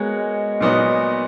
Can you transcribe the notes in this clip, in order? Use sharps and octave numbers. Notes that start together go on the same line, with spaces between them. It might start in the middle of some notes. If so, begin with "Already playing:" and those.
Already playing: G#3 B3 F#4 A#4 C#5
A#2 F#3 B3 D#4 F#4